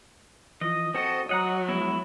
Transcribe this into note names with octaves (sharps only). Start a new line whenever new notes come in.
E3 F3 D#5
C4 F#4 A4 C5 D#5
F#3 C#5 D#5 F#5 A#5 D#6
F3 G#3 B3 E4